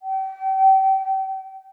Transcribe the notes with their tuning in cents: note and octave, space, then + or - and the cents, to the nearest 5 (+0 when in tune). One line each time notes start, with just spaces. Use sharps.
G5 -35